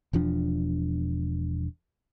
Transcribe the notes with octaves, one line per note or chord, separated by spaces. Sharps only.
E1 E2 F3 D4